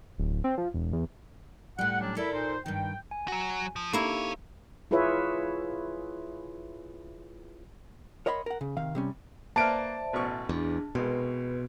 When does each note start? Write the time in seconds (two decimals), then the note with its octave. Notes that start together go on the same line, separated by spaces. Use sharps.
0.18 D1
0.44 C4
0.58 F3
0.74 E1
0.93 E2
1.79 A2 G3 F#5
2.01 F#3 C#4 D4
2.17 E4 A4 A#4 D5
2.33 A#2 D#4 C5
2.66 G2 D#3 G5
3.11 G#5
3.28 F#3 F#4
3.76 F3
3.93 A#3 C4 D#4 E4 G4 A4 C#5
4.91 E4 F4 G#4 B4 C#5 E5
8.26 A#4 C#5 D#5 F#5 B5 C6
8.46 A#4 F#5
8.61 C#3
8.77 C3 D#3 F5
8.95 C3 G3 C#4
9.56 A#3 B4 C5 D5 E5 A5 F6 D7
10.13 A1 B2 C#6
10.49 E2 D4 G#4
10.95 C2 B2 G#3 B4